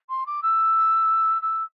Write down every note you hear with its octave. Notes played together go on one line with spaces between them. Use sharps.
C6
D6
E6
E6